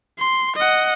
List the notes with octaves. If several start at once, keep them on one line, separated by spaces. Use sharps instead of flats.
C6
D#5 F#5